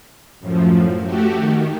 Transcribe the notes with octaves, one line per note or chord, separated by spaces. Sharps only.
F#2 A2 F3
A3 F#4 G4
D#3